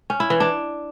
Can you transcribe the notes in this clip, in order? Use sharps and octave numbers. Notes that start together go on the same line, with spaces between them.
C#4
E4
E3
D4